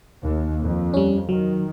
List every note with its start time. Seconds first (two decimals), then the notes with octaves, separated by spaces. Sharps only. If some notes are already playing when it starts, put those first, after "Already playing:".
0.22 D#2
0.61 F2
0.94 G3 C#4
1.29 D#3 F#3